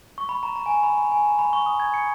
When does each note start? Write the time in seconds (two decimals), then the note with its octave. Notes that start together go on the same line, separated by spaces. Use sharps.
0.18 C#6
0.29 B5
0.43 A#5
0.56 A#5
0.66 G#5
0.70 A#5
0.83 B5
0.98 B5
1.12 G#5
1.25 A#5
1.39 B5
1.53 C#6
1.66 D#6
1.80 G#6
1.94 C#7